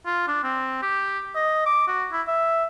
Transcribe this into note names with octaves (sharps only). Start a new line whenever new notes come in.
F4
D4
C4
G4
D#5
D6
F#4
E4
E5